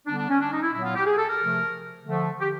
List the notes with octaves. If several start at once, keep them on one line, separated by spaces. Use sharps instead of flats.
D3 G3 B3 D4
D4
C#4
D4
D#4
E4
A#2 F#3 B3 E4
F4
G4
G#4
A4
A#4
C3 F3 A3
D3 F3 A3
G4